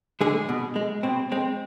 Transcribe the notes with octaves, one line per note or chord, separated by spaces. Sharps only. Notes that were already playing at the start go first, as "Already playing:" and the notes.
D3 G#3 G#4
B2
G#3
B2 C4
G#3 C4